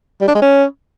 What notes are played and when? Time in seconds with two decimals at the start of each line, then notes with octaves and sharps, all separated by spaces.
0.21 G3
0.28 D4
0.35 G#3
0.42 C#4